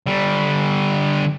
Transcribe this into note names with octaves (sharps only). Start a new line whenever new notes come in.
D3 G3